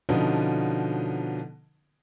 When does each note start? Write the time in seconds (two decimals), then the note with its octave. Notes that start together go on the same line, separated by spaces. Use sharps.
0.09 B2 D3 F3 B3 C#4 D#4